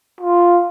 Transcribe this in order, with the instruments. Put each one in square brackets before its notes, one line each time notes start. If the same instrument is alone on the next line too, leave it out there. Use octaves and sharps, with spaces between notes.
[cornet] F4